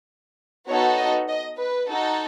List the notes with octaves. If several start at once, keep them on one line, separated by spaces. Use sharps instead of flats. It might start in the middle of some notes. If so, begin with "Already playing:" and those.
B3 D#4 F#4 A4 C#5
D#5
D#5
B4
D#4 F#4 A4